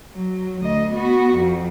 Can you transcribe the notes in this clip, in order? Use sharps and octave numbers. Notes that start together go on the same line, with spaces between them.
F#3
D2 D#5
B3 F#4
F2